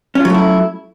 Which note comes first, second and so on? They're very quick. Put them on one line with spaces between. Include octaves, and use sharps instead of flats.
C#4 F4 F#3 A3 E4